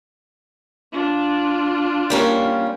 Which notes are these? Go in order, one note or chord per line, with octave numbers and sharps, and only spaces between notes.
D4 F4
G3 A#3 C#4